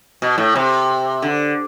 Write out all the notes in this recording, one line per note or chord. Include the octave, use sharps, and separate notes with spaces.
B2
A2
C3
D3